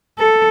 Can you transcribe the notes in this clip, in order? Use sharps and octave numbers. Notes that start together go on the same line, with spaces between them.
A4